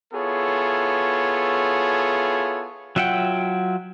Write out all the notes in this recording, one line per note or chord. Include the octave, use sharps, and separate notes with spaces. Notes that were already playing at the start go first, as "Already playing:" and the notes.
B3 E4 F4 G#4 A4 C#5
F#3 F4 E5 F#5 G5